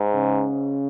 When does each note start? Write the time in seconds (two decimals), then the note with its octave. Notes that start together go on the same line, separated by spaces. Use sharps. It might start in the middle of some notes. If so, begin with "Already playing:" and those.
Already playing: G#2
0.14 C#3